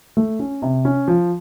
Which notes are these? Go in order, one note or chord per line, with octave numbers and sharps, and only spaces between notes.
A3
C#4
C3
C#4
F3